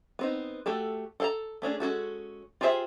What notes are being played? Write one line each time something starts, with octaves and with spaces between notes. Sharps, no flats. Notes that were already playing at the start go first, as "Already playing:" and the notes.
B3 C4 D#4
A3 F#4 G4 A4
A4 A#4 F5 A5 A#5
A3 C#4 D4 G#4
G#3 C#4 F#4 A4
F4 G4 G#4 C5 E5